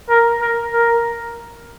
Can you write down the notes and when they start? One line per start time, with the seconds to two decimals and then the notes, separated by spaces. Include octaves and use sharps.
0.09 A#4
0.41 A#4
0.73 A#4